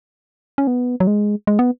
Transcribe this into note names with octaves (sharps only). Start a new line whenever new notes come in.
C#4
B3
F#3
G#3
G#3
B3